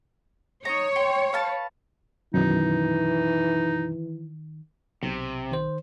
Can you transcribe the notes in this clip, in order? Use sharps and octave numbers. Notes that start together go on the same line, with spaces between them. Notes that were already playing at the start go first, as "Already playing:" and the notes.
D#4 C#5 A#5
G5 C6
B4 F5 A5
F#2 B2 D#3 E3 D#4
B1 C3
D#3 C5